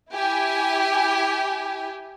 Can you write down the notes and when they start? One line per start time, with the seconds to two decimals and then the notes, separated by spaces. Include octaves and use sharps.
0.12 E4 G4 G#5